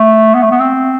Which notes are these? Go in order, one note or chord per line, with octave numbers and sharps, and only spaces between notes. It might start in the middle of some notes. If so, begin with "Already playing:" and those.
Already playing: A3
B3
A3
B3
C4